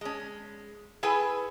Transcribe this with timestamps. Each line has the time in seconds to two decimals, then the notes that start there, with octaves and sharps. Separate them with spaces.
0.01 G#3 C#4
1.03 E4 G#4 A4 B4 G5 G#5